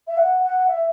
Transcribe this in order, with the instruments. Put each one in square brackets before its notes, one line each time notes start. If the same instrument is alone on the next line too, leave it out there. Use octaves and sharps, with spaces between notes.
[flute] E5
F#5
F#5
E5